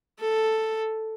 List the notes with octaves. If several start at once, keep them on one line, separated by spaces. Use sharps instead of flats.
A4